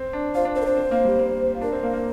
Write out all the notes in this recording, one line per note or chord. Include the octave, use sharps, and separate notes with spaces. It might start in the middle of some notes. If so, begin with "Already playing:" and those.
Already playing: C4
D4
F4 C5
D4
C4 C5
A#4
D4 C5
C4
A#3
G3
A#3
F4
D4 A#4
C4
A#3
A#3